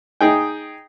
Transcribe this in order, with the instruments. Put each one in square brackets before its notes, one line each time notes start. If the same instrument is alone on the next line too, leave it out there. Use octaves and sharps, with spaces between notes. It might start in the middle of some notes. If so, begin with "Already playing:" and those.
[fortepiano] D#4 G#4 G5